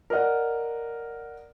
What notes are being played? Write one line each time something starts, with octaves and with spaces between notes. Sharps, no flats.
A#4 D5 D#5 F#5